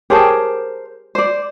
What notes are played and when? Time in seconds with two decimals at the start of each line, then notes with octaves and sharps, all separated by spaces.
0.10 G4 G#4 A#4 C5 C#5 A5
1.15 C5 D5